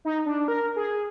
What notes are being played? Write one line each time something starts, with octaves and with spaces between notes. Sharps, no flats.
D#4
D4
A#4
G#4